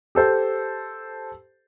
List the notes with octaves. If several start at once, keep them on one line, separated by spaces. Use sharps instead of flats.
G4 A4 C5